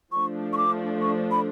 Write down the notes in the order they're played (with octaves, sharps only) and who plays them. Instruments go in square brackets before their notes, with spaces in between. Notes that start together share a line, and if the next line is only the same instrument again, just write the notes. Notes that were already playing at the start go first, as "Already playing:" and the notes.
[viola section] F3 A3 D4 [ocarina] C#6
[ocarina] C#6
D6
C#6
B5